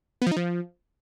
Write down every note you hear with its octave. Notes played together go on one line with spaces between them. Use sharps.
B3
F3
D#4
F3